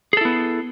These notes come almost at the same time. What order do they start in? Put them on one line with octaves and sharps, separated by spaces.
G#4 A4 E4 B3